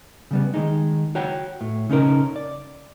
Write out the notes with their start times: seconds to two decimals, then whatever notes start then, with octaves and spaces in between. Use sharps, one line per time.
0.31 C#3 G3 B3
0.54 D#3 G#3 D#4
1.15 F#4 C#5 F#5 G5
1.61 A2
1.90 C#3 C#4 D#4 A#4
2.36 D5